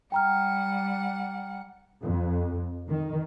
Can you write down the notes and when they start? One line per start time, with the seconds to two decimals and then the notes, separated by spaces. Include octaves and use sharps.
0.12 G3 F#5 G5 A#5 F6
2.03 F2
2.89 D#3